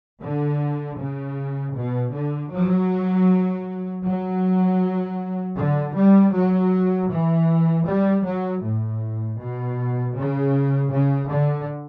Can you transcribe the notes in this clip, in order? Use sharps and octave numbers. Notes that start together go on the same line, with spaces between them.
D3
C#3
B2
D3
F#3
F#3
D3
G3
F#3
E3
G3
F#3
A2
B2
C#3
C#3
D3